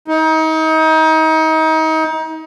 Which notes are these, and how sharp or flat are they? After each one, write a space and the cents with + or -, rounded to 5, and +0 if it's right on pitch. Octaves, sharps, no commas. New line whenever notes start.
D#4 +30